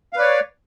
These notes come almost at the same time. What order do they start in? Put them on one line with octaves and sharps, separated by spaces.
F5 B4 D5 C#5